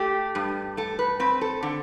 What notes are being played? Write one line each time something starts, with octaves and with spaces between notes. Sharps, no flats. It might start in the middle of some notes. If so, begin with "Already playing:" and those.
Already playing: A3 G4
G2
A3 A4
B4
C4 B4
A4
D3